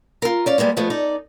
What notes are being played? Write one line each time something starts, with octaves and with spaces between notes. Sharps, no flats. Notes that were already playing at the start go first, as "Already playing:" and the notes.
F4 A#4
C#4 D5 F5
G3 G#3 A#3 B3
F3 G#3 A3 B3
D#4 A4 D5